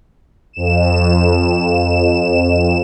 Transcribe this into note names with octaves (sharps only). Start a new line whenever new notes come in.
F2 E7